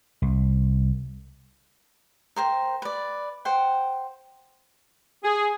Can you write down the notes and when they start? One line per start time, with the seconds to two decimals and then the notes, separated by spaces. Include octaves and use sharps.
0.22 C2
2.36 A#4 C5 G5
2.82 B4 D5
3.45 C5 F#5 G5
5.23 G#4